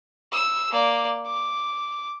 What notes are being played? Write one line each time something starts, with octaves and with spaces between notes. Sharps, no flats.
E6
A#3 D5
D6